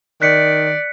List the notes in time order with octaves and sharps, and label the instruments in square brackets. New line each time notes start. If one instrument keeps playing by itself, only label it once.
[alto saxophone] D#3 [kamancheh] D5 [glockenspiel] F#6 B6 C#7